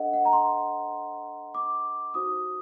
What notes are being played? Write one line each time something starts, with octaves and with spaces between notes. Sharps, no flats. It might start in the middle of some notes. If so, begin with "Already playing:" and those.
Already playing: D4 A4 C5 D#5 F#5
F#5
A#5
C6
D6
D#4 F#4 C5 D#6